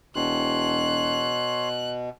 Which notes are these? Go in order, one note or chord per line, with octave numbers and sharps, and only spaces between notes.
E1 B2 C#5 C6 F#6